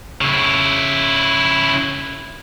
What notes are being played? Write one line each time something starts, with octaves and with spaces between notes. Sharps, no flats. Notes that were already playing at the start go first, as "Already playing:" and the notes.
C#3 E4